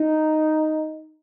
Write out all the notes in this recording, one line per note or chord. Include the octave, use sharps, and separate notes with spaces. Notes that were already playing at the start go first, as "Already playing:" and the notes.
Already playing: D#4